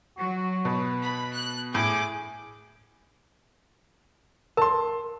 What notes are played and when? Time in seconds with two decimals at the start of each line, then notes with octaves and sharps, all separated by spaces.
0.18 F#3 F#4
0.65 B2 B4
1.02 B5
1.35 F#6
1.75 A2 G#4 D6
4.57 A#4 A5 C6